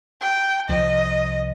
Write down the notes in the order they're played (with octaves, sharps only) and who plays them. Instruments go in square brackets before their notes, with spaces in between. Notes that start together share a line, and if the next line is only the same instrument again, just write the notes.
[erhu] G5
[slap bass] C2 F3 [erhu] D#5